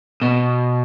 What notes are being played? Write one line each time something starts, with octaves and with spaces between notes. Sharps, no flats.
B2